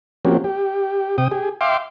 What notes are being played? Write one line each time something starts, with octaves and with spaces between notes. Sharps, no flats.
F3 A#3 C4 C#4 F#4 G4
G4
C3 G5 D#6
G4 G#4
E5 F5 G5 C6 D6